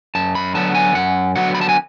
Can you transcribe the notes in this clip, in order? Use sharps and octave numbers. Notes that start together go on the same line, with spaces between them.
F#2 A5
B5
D3 F#3 B3 A5
G#5
F#2 F#5
D3 F#3 B3 F#5
B5
A5
G#5